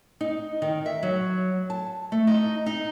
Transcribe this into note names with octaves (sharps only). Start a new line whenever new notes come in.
D#4
D#3
E5
F#3
A5
A3
D#4
D#4